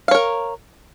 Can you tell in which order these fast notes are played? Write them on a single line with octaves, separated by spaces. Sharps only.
F5 C#5 A#4